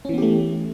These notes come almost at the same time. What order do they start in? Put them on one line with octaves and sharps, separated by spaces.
C#4 E3 B3 G4 A3